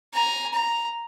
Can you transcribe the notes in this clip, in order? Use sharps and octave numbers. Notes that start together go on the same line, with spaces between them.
G#5 A#5
A#5